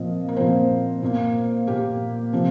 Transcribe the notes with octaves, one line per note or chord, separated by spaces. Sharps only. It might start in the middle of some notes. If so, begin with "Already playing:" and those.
Already playing: A#2 F3 C4 D#5
A#4
A#2 F3 C4 C5
A#2 A#3
A#2 A#3 G4
C3 F3 C4